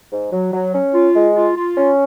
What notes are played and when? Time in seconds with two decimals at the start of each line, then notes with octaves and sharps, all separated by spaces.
0.12 G#2
0.32 F#3
0.53 F#3
0.74 C#4
0.94 F4
1.15 G#3
1.36 F4
1.57 F4
1.77 C#4